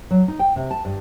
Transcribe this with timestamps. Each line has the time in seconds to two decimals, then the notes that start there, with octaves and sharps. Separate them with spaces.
0.11 F#3
0.28 D#4
0.39 G5
0.56 C3
0.71 A5
0.85 G2